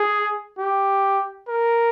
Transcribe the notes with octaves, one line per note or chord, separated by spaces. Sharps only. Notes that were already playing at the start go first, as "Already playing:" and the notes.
Already playing: G#4
G4
A#4